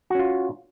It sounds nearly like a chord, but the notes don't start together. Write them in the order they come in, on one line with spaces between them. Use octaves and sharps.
F#4 C#4 F4